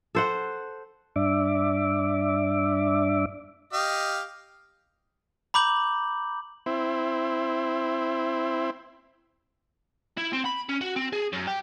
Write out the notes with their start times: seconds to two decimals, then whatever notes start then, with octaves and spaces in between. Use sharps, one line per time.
0.15 A4 C5 F#5
1.16 G2 D4 E5 D6
3.73 G4 D#5 F5
5.54 A#5 B5 D6 G6 F#7
6.66 C4 E4
10.17 E4
10.33 C4
10.45 B5
10.69 C#4
10.81 F#4
10.96 C4
11.13 G#4
11.32 F#2
11.47 G4